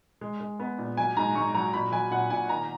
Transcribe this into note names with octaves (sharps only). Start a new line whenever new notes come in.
G#3
G#3
B3
A#2
F#3 G#5
G#2 A#5
G#2 C#6
F#3 A#5
A#2 B5
F#3 G#5
A#2 F#5
A#2 G#5
D#3 A#5